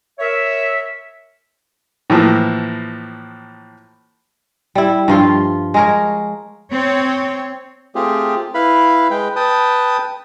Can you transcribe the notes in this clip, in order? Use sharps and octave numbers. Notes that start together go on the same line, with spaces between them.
A#4 C#5 E5
A2 E3 F3 A#3
G3 E4
G2 F3 F4
G#3 A#4 C#5
C4 C#5
A3 C4 F4 G4 G#4
E4 B4 F5 B5
G#3 B4 G5
B4 G5 A5 D#6